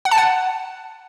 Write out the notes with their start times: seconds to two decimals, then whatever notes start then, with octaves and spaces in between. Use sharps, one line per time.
0.05 F#5
0.11 A5
0.18 F#5